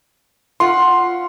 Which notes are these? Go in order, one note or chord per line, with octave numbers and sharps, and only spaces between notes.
C#4 F4 F#5 C6